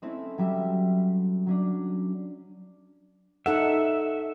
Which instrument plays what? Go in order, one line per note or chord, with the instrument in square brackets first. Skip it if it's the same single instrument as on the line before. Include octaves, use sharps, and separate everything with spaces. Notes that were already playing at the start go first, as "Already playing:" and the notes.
[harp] G#3 A3 C4 C#4 E4
F#3 G3 E5
F#3 C#4 D4
[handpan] D#4 A4 F#5 [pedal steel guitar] E5